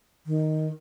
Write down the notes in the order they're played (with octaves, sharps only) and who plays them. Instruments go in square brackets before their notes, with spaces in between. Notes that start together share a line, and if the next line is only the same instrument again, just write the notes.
[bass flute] D#3